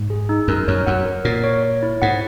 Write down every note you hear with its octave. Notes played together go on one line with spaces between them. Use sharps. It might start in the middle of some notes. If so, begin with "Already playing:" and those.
Already playing: G#2
G#4
D#4
F#2 A#4
F#2 C#5
F#2 F#5
A#4
A#2 A#4
C#5
C#5
E4
G#2 F#5